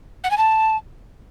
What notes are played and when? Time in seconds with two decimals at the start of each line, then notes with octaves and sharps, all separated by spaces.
0.24 F#5
0.31 G#5
0.38 A5